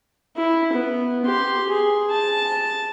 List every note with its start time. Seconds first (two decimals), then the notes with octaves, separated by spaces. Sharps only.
0.37 E4
0.73 B3
1.26 G4 C6
1.68 G#4
2.11 A5